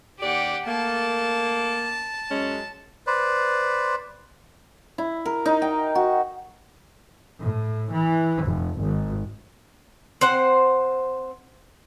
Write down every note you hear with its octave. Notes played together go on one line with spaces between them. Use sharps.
D#2 G4 D5 F#5
A3 A#3 A5
F#2 G#3 C#4
B4 C5 D5
E4
A#4
D#4
G5
F#4
A2
E3
F1
G#1
C4 C5 F#5